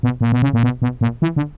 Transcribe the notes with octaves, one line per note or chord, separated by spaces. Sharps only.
B2
A#2
B2
C#3
A#2
B2
B2
A#2
E3
D3